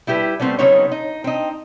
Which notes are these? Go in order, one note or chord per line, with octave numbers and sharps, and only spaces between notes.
G3 E4 G4 A#4 B4
G3 A3 B3 C4
C#3 F#3 B3 C4 D#4 C#5
D#4
C4 D#4